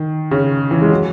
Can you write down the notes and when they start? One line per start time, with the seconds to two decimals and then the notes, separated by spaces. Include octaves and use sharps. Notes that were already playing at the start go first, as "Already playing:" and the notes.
Already playing: D#3
0.31 C#3
0.71 E3
0.82 G#3
0.91 F#3